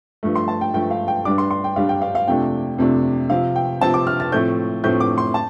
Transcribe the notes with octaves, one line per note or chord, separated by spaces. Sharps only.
G2 F3 A3
C6
A5
G5
G2 F3 A3 G5
F5
G5
G2 G3 D4 D6
C6
C6
G5
G2 G3 D4 F5
G5
F5
F5
F2 C3 A3 D4 G5
F2 C3 A3 D4
C3 F3 C4 F5
G5
C3 F3 C4 A5
D6
F6
A6
A2 F3 A3 C4 G6
A2 F3 A3 C4 G6
D6
C6
A5